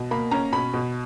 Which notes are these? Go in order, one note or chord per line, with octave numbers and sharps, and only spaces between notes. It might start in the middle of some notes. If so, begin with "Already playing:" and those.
Already playing: B2
A#3 B5
C#4 A#5
B2 B5
B2